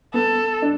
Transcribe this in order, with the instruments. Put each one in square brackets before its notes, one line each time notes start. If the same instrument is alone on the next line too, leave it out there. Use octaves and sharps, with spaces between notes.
[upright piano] B3 [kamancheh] A4
[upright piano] D4